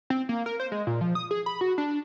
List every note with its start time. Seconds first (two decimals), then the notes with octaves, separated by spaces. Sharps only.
0.10 C4
0.29 A#3
0.46 A#4
0.60 C5
0.72 G#3
0.87 A#2
1.01 F3
1.15 D#6
1.31 G#4
1.46 B5
1.61 F#4
1.78 D4